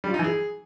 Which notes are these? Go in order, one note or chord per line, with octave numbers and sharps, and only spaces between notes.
G3
F4
D#4
E3
G#4